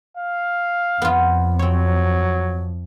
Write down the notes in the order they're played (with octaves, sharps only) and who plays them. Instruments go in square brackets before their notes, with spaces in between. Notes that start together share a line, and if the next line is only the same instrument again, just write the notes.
[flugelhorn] F5
[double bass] F2 [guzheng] B3 F4
[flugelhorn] F#3 [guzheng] C4 C#5